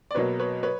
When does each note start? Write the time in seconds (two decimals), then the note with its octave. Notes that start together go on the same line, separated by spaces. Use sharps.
0.11 D5
0.14 B2 F#3 A#3 B4 C#5
0.40 B4 C#5
0.63 B4 C#5